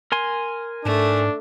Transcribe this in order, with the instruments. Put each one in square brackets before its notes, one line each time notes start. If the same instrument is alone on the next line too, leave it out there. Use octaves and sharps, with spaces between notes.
[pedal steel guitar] A#4 G#5 C6
[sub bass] G#2 [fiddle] A3 [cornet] D4